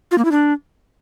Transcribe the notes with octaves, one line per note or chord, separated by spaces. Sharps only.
F4
A#3
E4
D4